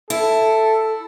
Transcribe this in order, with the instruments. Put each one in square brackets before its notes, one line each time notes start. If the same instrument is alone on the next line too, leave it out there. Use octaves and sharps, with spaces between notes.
[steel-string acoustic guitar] E4 [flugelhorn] A4